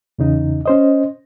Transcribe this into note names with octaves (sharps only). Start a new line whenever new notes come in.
E2 C#3 D#4
C#4 C5 D#5